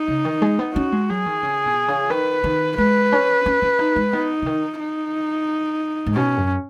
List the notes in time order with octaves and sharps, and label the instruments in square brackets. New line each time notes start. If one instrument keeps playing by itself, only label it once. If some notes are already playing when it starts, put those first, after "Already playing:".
Already playing: [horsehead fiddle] D#4
[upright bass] C#3
D#3
G#3
B3
[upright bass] C#4 [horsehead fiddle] F#4
[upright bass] G#3
[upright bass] F#3 [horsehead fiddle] G#4
[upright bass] D#3
C#3
B2
C#3
[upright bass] D#3 [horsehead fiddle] B4
[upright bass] D#3
[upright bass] G#3 [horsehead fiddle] B4
[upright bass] C#4
C#4
C#4
D#4
G#3
[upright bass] B3 [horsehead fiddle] D#4
[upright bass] C#3
D#3
[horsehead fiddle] D#4
[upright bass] G#2
[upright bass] B2 [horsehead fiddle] C#4
[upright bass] F#2